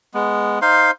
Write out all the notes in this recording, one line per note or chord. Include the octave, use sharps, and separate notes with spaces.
G#3 B3
D#4 C5 F5 C6